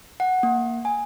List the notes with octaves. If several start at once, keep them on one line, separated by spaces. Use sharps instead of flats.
F#5
A#3
G#5